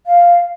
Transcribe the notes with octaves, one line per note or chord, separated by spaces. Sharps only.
F5